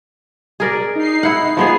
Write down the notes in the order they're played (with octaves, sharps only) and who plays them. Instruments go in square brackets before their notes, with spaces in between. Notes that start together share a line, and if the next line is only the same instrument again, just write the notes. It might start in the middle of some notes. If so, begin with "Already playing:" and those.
[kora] G#4 A#4 D5
[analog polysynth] D#4 C7
[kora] E4 F#5
F3 B3 G#4